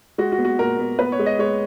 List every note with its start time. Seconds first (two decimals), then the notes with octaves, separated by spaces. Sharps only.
0.18 G#3 F#4
0.32 F#4
0.38 B3
0.45 F#4
0.59 A#2 A#4
0.79 B3
0.99 B3 B4
1.12 C#5
1.19 G#3
1.26 D#5
1.39 G#3 C#5